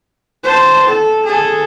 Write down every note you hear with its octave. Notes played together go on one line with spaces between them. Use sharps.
C5 A5
A4
G#4 A4